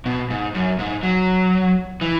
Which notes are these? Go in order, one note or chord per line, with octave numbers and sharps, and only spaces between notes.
B2
G#2
F#2
G#2
F#3
E3